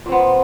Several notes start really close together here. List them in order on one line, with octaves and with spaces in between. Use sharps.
A#2 C4 B3